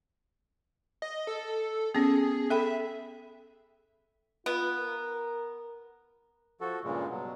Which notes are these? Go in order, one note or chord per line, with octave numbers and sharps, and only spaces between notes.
D#5
A4
B3 C#4 G#4
A4 E5 G5 B5
B3 F4
A#4
F3 F#4 A4
G2 A#2 C#3 G#3
B2 F#3